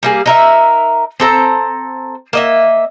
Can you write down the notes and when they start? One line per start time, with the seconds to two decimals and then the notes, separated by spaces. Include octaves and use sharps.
0.03 G3 A#3 G#4
0.26 D#4 A#4 E5
1.20 C4 A4 A#5
2.33 A#3 D#5 E5